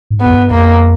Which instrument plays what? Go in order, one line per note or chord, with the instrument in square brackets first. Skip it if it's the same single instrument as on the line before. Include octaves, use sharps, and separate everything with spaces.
[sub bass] G#2
[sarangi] B3
[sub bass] F#2
G2
[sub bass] F2 [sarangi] A#3